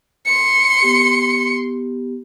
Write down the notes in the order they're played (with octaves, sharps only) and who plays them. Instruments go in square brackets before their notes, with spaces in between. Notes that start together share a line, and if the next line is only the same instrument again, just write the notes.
[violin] C6 C#7
[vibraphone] B3 G4